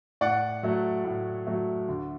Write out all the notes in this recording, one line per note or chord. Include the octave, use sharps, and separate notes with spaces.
A2 D5 F#5
F#3 A3
A2
F#3 A3
D2